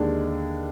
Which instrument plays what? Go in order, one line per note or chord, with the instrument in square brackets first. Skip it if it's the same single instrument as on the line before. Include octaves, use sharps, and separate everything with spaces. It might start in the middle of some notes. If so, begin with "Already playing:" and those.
Already playing: [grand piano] D#2 D3 G#3 D4 G4